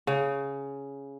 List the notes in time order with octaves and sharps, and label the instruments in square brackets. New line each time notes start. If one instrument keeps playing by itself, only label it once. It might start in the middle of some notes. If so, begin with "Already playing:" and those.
[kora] C#3